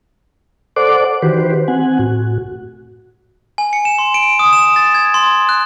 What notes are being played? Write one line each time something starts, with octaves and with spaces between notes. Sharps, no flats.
A4 C5 D5 F#5 D6
D#3 E3 F#4 G4 B4 C5
C4 F#5 G#5
A2 F#4
G#5
C#7
E7
C6
D7
D#6
E7
A6
G#6
C6
F#6